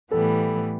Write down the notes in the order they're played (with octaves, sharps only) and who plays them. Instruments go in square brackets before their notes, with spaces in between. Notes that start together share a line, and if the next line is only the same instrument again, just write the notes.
[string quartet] A2 E3 G3 B3 [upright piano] A4